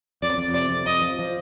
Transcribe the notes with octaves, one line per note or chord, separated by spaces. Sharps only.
F2 D5
F2
C3 D5
F2
F2 D#5
F3
F3